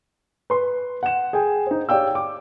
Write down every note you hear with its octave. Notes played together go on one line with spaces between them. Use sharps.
B4 C6
F#5 E7
G#4 G5 G#5
D#4 C5
G4 C#5 D5 F5 G5 E6
D6